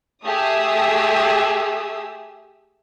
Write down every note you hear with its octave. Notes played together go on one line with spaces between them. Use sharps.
A3 G4 G#4 E5 D#6 E6